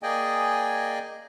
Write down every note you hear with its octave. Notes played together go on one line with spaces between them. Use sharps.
A#3 G#4 D5 D#5 G5 G#5